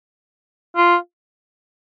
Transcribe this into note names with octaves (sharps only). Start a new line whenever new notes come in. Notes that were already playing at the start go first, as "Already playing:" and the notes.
F4